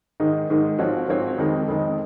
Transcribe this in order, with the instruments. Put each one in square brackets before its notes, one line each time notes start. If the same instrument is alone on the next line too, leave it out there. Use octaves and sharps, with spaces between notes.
[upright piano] G#2 D#3 G#3 D#4
G#2 D#3 G#3 D#4
G#2 F3 C4 F#4 C#5
G#2 F3 C4 F#4 C#5
F2 D#3 G#3 D#4
F2 D#3 G#3 D#4